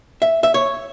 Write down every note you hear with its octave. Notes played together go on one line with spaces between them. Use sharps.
E5
E5
C#5